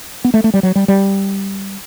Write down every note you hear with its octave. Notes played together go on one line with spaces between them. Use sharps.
B3
A3
A3
G3
F#3
G3
G3